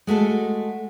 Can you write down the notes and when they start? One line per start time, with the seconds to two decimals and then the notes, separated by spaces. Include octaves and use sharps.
0.07 G#3 A3 F#4 A4